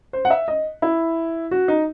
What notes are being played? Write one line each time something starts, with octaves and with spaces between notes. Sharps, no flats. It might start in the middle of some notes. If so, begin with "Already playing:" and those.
C5
F#5
E5
D#5
E4
F#4
D#4